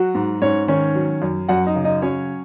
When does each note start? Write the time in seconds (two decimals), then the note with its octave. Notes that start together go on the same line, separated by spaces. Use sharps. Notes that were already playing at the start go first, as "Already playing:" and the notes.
Already playing: F#3 F#4
0.15 G#2
0.42 G#2 C#4 C#5
0.68 D#3 C#4 C#5
0.95 F#3
1.22 F#2
1.48 F#2 F#4 F#5
1.66 D#4 D#5
1.75 C#3
1.85 D#4 D#5
2.02 F#3 C#4 C#5